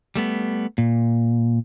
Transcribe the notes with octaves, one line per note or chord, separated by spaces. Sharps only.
G3 A3 B3
A#2